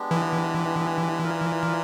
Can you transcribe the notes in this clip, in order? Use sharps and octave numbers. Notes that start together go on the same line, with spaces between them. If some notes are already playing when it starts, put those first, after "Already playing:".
Already playing: G#3 B3 D4 G4
E3
F4 A#4 D5